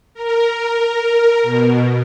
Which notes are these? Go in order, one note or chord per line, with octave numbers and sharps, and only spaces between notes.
A#4
B2